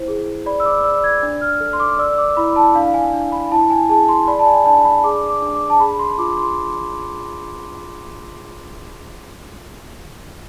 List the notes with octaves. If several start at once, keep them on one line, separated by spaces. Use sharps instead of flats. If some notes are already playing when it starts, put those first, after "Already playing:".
Already playing: E4 C5
G#4
D5 B5
E6
D6
D5 E6
G#6
D4
F6
A4
C6
D6
D5 E6
D6
E4 B5
A5
D4 F5
F5
G#5
D4
B5
E4 A5
G#5
G#4 A5
C6
D5 B5
A5
G#5
D4 A5
B5
G#4 D6
D6
D4
D6
A5
G#4 B5
C6
F4 D6
C6